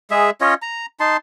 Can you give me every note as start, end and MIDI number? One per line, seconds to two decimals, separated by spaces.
0.11 0.30 56
0.11 0.30 68
0.11 0.30 76
0.41 0.54 61
0.41 0.54 65
0.41 0.54 73
0.41 0.54 75
0.62 0.86 82
1.00 1.17 63
1.00 1.17 81
1.00 1.17 84